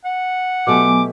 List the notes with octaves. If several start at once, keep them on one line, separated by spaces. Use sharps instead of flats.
F#5
B2 F#3 A3 B3 G4 G#5 D6